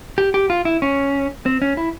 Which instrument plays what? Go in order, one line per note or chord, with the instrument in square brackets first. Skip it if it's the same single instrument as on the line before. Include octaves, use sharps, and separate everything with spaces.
[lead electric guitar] G4
G4
F4
E4
C#4
C4
C#4
E4